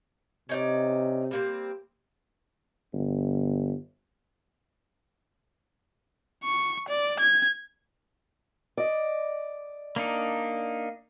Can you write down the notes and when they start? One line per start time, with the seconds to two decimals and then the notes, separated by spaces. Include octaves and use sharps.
0.49 C3 C#4 D#4 D5
1.31 G3 A#3 C4
2.93 G1
6.44 C#6
6.89 D5
7.20 G#6
8.77 D5 D#5
9.96 A#3 D4 D#4